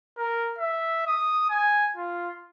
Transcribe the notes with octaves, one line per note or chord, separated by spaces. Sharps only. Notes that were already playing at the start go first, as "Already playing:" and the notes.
A#4
E5
D#6
G#5
F4